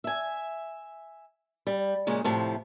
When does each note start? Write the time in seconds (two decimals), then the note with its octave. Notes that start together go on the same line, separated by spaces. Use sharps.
0.04 E5 G#5
1.67 G3
2.07 A#2 C#3 G#3
2.24 A2 C3 F3